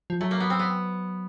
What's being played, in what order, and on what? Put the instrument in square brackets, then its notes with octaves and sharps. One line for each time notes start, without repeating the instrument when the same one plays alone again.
[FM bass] F3
[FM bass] F#3 [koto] A3
[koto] A#3
B3
C4
B3